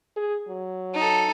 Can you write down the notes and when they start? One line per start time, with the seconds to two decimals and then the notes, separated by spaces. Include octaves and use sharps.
0.16 G#4
0.48 F#3
0.94 D#4 A4